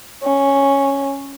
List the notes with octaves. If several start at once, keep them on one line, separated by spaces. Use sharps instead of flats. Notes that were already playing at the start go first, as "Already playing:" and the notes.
C#4